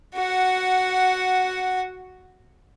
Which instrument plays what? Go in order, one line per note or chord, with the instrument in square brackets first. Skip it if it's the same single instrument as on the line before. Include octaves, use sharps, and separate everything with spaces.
[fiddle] F#4 F#5